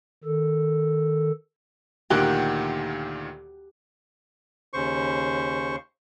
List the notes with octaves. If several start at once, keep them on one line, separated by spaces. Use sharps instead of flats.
D#3 A4
D2 A#2 D#3 G4 F#5 G5
D#2 C#3 C5 C#6